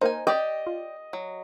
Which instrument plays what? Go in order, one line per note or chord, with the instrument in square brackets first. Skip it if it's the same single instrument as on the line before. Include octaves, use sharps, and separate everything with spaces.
[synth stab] A#3 A#4 C5 [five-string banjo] D#4 G#5
[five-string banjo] G4 D5 G5 [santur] D#5
[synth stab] F4
[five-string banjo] F#3